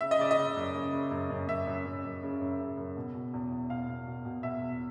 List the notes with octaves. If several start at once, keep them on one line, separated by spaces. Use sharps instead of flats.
C#3 E5
D#5
C#3 D5
D#5
C#3
F#2
C#3
C#3
F#2
F#2
F#2 E5
F#2
F#2
F#2
C#3
F#2
C#3
F#2
B2
B2
E2
E2
B2 F5
B2
B2
B2
B2 E5
E2